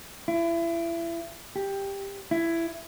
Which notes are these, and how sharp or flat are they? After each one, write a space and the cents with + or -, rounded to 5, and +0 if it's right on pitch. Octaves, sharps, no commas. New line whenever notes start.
E4 +30
G4 +10
E4 +15